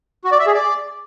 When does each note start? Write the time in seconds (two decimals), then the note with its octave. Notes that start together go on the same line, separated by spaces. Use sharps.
0.25 F#4
0.32 D5
0.39 E5
0.47 G#4
0.54 D5